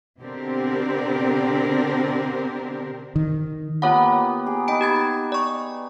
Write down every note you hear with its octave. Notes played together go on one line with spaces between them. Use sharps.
B2 D3 C4 D4 G4 A#4
D#3
A#3 B3 F4 G4 C#5 F#5
G4 G#4
D#4 B4 G5 D7
G4 G#6 A6
D5 C#6